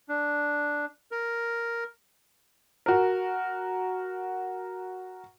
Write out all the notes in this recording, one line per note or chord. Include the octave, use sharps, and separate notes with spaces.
D4
A#4
F#4 A#4